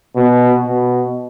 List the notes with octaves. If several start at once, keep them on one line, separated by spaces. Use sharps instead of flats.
B2
B2